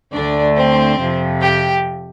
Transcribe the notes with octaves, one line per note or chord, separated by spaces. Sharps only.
D2 D3 A3 D4 D5
C4 C5
F2 C3 F3
G4 G5